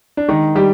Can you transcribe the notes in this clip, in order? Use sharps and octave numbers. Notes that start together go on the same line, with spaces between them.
D4
D#3 G#3 D#4
G3 G4